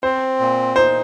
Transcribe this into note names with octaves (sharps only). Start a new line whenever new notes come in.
C4 C5
A#2
D#4 C5